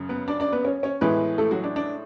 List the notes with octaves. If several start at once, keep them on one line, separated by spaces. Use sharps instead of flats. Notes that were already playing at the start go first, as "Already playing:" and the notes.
Already playing: F#2 C#3
B3 B4
D4 D5
D4 D5
B3 B4
C#4 C#5
C#4 C#5
A2 E3 G#3 B3 B4
A3 A4
F#3 F#4
D4
D4